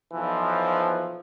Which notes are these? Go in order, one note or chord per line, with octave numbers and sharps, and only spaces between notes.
B1 E3 F3